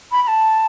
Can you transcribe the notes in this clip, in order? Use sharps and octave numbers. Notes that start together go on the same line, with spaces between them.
B5
B5
A5